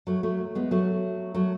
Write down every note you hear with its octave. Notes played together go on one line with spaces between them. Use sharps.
F#3 A3
F#3 A3
G#3 B3
F#3 A3
F#3 A3